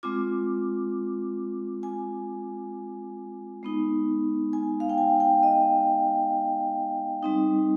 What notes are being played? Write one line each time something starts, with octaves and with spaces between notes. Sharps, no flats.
G#3 C4 F4 D6
G#5
G#3 B3 D#4
G#5
F5
G5
G#5
G5
D#5
G3 C4 D#4